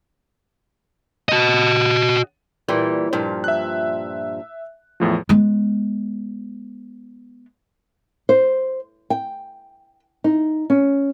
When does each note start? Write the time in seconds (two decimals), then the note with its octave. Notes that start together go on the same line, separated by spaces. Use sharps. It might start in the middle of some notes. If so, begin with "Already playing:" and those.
1.29 F#4 D#5
2.68 A#2 E3 G3
3.13 G2 A#2 F3
3.44 E5 F#6
5.00 E2 A2 F3
5.29 G#3 B3
8.29 C5
9.10 G5
10.24 D#4
10.70 C#4